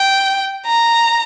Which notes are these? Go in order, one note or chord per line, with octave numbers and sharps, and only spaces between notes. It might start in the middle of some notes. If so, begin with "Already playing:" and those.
Already playing: G5
A#5